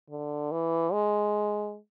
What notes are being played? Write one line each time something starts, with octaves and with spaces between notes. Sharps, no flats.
D3
E3
G#3